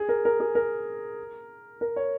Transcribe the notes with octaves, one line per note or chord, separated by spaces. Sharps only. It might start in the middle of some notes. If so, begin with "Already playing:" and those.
Already playing: G#4
A#4
A#4
G#4
A#4
A#4
C#5